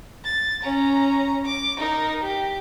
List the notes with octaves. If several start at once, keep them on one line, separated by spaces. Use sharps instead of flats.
A6
C#4 A#5
D6
D#4 A#4
G4